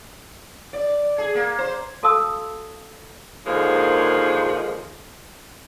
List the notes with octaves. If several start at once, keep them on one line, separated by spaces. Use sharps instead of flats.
D5
G#4
A#3
C5
F#4 A4 F5 A5 D#6 E6
D#2 G#2 D3 F3 G#3 A#3